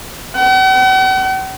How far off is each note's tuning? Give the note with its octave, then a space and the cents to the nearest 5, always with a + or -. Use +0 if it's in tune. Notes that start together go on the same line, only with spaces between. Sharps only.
F#5 +45